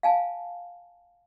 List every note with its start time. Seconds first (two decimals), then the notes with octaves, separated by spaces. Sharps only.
0.03 F5 G#5 A5